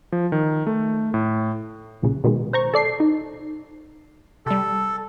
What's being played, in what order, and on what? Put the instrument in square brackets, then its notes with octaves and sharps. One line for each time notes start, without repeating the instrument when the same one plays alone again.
[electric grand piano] F3
D#3
A3
A2
[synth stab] B1 A#2 C#3
B2 D#3 G#3
C5 A#5 C#6
A4 D5 C7
D#4
[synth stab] C3 G3 [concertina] A4